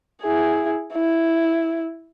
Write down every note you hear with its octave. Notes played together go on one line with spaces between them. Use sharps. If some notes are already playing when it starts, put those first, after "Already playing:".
E4 G#4
E4